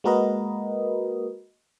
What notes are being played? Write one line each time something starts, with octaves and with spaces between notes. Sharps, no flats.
G#3 A#3 F#4 A#4 B4 D#5